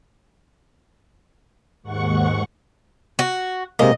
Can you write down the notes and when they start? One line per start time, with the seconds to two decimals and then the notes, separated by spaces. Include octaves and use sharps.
1.83 D#2 G#2 F#5 C#6
3.19 F#4
3.79 C3 G#3 A#3 D#5